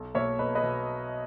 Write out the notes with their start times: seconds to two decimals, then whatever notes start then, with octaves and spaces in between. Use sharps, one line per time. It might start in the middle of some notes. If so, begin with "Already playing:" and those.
Already playing: B1
0.15 B2 A#3 C#5 E5
0.39 B1 B4 D#5
0.55 B4 D#5
0.63 B2